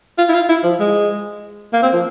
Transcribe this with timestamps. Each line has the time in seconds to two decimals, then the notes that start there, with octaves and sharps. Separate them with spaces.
0.18 F4
0.29 E4
0.34 F4
0.49 E4
0.64 F3
0.80 G#3
1.73 A#3
1.83 C4
1.93 F3